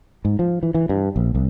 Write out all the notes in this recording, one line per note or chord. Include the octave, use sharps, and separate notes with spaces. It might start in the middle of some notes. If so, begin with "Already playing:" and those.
G#2
F3
E3
E3
G2
A#1
C2